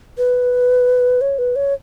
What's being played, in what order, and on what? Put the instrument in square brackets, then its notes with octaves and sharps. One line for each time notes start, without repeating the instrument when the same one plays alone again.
[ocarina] B4
C#5
B4
C#5